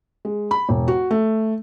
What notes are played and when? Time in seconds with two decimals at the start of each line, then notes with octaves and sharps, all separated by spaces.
0.25 G#3
0.51 B5
0.69 E1
0.88 F#4
1.11 A3